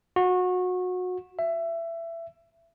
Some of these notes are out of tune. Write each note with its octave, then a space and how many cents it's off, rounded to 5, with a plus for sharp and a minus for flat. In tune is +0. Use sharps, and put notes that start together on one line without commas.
F#4 -25
E5 +20